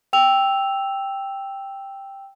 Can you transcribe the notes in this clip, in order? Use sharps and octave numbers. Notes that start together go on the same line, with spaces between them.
G5 E6 F7